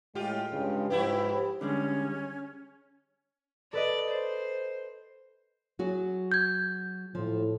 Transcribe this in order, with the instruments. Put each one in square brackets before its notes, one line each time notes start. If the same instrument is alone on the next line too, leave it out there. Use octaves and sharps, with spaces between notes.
[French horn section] A2 G#3 [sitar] F4 G4
[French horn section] G2 C#3 G#3
[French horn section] G#2 B4 [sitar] F3 E4 G4
[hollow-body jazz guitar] D3 G3 G#3 [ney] C#4
[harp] A4 B4 D#5 [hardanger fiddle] D5
[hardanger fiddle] C5
[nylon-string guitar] F#3 F#4 G#4
[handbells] G6 G#6
[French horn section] A2 [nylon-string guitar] F3